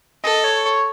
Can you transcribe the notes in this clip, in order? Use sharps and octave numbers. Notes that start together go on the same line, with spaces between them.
A4 D#5
C#5
C#5